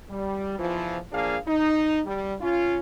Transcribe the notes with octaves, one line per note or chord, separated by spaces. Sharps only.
G3
E2 E3 F3
F3 A#3 D4 G#4 F5
D#4
G3
C#4 F4